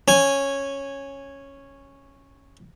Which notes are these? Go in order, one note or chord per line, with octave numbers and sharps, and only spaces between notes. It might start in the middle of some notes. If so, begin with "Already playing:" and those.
C#4 G#5